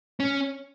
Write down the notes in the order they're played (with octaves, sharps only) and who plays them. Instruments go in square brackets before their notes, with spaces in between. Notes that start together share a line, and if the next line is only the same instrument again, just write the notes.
[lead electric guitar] C#4